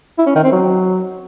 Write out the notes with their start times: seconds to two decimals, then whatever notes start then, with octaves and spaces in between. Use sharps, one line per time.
0.18 E4
0.27 C#4
0.35 D#3
0.44 C4
0.52 F#3